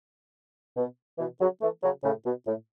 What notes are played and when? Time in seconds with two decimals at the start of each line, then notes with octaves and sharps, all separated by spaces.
0.77 B2
1.18 B2 E3
1.40 C#3 F#3
1.62 E3 A3
1.83 C#3 F#3
2.04 A2 C#3
2.25 B2
2.47 A2